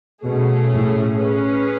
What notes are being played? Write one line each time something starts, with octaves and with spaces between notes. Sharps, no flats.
B2 A3 C#4 G#4
A2
C#4 G#4 B4